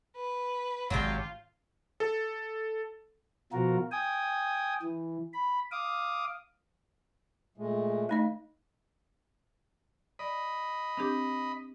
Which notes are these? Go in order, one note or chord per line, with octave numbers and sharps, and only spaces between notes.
B4
G#1 F#3 D4 F4 G4
A4
B2 F3 F4 F#4 A#4
G5 G#5 D#6
E3
B5
F5 D6 D#6
A#2 G#3 A3
D#3 A3 D#4 D#5
D5 D#5 B5
C4 D4 G4